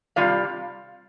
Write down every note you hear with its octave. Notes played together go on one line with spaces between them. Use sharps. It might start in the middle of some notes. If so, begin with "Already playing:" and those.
C3 G3 F4 D5 F5